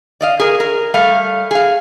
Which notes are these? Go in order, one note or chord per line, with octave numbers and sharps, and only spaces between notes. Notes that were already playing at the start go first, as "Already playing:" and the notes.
D5 D#5 F5
G#4 A#4
A#4
G3 A3 F5
G#4 F5